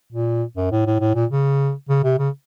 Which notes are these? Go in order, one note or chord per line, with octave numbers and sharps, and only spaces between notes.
A#2
F#2
A2
A2
A2
A#2
C#3
C#3
C3
C#3